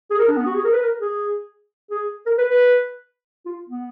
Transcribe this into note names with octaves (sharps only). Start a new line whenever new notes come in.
G#4
A#4
D4
B3
F#4
G#4
A#4
B4
A#4
G#4
G#4
A#4
B4
B4
F4
B3